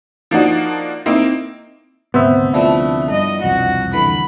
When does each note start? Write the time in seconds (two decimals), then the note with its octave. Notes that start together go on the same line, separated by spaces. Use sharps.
0.31 F3 A#3 D4 D#4 F#4
1.06 A#3 C4 D#4 E4
2.14 G#1 D2 C3 B3 C5 E5
2.54 F3 A3 D4 E4
3.10 G2 D#5
3.42 E1 C2 F2 F#4
3.94 D3 E3 B5